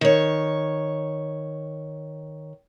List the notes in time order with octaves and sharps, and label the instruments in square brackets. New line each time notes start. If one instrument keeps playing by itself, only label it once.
[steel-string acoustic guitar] D#3 C#5